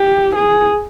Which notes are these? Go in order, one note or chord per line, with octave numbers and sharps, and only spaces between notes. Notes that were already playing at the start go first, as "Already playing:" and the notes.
Already playing: G4
G#4